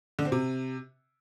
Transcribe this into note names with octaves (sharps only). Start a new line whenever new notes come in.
D3
C4
C3